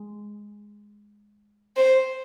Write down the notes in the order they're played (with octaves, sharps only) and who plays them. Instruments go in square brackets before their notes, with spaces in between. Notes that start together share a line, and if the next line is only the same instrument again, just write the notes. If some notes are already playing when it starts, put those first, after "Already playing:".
Already playing: [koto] G#3
[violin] C5